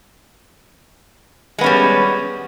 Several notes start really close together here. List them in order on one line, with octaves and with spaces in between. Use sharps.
G#3 B3 C#4 G3